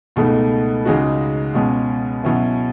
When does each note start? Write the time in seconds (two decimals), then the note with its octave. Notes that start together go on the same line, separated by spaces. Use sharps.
0.16 C#2 B2 A3 D#4
0.85 C#2 C#3 G#3 D#4 F#4
1.54 C#2 B2 G#3 C#4
2.24 B2 F#3 C#4 E4